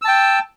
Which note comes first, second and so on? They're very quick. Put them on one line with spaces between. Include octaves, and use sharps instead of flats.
E6 A5 G5